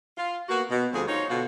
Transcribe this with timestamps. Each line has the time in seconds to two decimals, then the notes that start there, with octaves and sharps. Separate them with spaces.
0.17 F4
0.49 A#3 B3 F#4
0.70 B2
0.93 D2 F3 G3 C4 G#4
1.08 D#4 F4 C5 C#5
1.30 B2 D3 F4 F#4